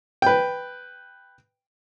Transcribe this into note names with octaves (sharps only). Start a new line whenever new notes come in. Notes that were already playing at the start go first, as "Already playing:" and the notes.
B4 G5